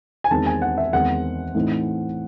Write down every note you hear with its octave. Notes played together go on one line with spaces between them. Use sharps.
G#5
E2 D#3 G#3 C4 D#4 A5
G#5
F#5
E5
E2 D#3 G#3 C4 F#5
A2 E3 C4 D#4